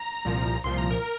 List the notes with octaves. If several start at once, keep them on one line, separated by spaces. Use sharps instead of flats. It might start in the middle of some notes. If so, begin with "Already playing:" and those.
Already playing: A#5
C2 A#2 F3
C2 A#2 F3 C6
A#5
A#4